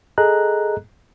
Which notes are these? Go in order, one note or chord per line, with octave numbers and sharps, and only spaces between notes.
G#4 A4 D#5 A#5 F#6